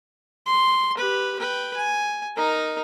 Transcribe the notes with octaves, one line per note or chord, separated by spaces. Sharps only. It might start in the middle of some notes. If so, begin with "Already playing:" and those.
C6
G4 B4
B4 G5
G#5
D#4 A#4